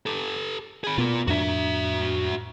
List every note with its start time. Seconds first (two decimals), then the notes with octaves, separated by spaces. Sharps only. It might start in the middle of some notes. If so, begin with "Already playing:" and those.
0.06 G4 A4
0.84 G#4 B5
0.98 B2 B3 F4 A#4
1.27 F2 A2 D4 F#4 E5